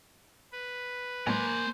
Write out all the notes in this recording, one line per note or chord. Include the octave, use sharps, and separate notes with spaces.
B4
A2 F#3 G#3 A#3 A#4 C5 G#5